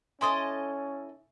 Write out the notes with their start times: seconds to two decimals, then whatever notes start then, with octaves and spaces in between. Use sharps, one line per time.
0.21 C#4 E4 A4 D#5 G#5 C6 D#6